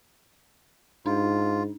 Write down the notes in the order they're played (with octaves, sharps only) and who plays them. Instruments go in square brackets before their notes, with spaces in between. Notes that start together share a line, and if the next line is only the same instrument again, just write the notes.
[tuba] G#2 [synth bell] D4 D#4 [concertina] F4